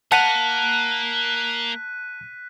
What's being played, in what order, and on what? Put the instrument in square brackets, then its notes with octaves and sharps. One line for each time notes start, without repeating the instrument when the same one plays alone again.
[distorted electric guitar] A#3 F5 [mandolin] F#5 [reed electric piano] A5 [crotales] F#6 B6 D#7